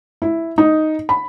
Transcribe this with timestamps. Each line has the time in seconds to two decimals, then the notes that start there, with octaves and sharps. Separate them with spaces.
0.22 E4
0.58 D#4
1.09 B5